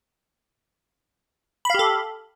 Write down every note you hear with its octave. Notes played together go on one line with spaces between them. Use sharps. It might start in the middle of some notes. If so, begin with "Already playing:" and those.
G4 A4 F5 B5